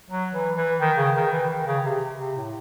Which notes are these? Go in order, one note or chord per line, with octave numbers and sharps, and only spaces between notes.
F#3
E3
E3
D#3
C#3
D#3
E3
D#3
C#3
C3
C3
A2